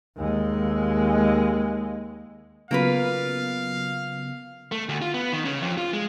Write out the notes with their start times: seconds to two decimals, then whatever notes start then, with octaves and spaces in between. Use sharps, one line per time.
0.17 D#2 G#3
2.71 C#3 F#3 A#3 B3 F4 B4 F5
4.72 A3
4.89 D2
5.02 F4
5.14 B3
5.33 D#3
5.45 C#3
5.62 F2
5.77 F4
5.93 G#3